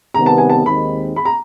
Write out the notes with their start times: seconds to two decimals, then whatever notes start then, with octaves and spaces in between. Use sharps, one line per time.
0.14 C3 D#3 G3 B3 A#5
0.26 A5
0.38 G#5
0.50 A5
0.66 D#2 D#3 G#3 C4 D#4 B5
1.16 B5
1.25 A#5